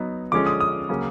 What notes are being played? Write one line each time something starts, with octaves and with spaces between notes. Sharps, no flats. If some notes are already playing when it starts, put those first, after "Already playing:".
Already playing: F#3 B3 D#4
D3 F3 G#3 C#4 D6
D#6
D#6
C#3 F#3 A#3 C#4